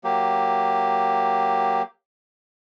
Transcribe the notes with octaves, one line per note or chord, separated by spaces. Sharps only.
F#3 A#3 G4